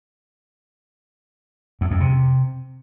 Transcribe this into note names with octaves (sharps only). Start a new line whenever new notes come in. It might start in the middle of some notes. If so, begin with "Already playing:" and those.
E2
F2
C3